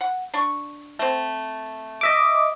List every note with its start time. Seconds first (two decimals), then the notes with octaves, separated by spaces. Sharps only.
0.01 F#5
0.34 D4 C#6
0.99 A3 C4
2.01 D#5 E5 D6